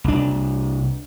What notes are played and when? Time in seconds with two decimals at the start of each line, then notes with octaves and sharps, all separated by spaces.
0.04 C2 D4